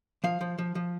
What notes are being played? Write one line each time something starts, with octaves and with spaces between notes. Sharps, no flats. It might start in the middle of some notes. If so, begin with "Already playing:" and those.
F3 F5
F3
F3
F3